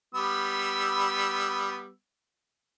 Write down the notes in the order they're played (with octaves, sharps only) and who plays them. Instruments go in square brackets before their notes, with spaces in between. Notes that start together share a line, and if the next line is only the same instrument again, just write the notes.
[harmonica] G3 B3 E6